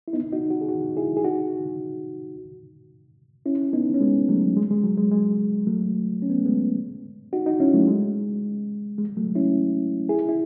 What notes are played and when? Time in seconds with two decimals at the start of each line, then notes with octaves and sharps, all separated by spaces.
0.08 E4
0.13 B3 D#4
0.32 D#4 F#4
0.51 D#4 F#4
0.61 G#4
0.69 D#4 F#4
0.97 E4 G#4
1.17 G#4
1.24 D#4 F#4
3.46 C#4 E4
3.73 B3 D#4
3.94 C#4
4.01 G#3 B3
4.28 F#3 A3
4.57 G#3
4.71 G#3
4.84 F#3
4.97 G#3
5.12 G#3
5.67 F#3 A3
6.22 C#4
6.30 B3
6.38 A3
6.46 G#3 B3
7.33 D#4 F#4
7.46 D#4 F#4
7.60 C#4 E4
7.74 F#3 A3
7.88 G#3
8.98 G#3
9.17 F#3 A3
9.36 C#4 E4
10.09 E4 G#4
10.29 E4